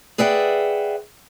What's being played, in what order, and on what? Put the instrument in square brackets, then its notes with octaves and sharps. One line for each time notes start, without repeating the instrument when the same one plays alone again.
[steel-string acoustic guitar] G#4 B4 D5 E5 F#5 G5